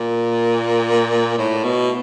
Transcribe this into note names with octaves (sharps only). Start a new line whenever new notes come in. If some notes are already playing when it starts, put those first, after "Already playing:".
Already playing: A#2
A2
B2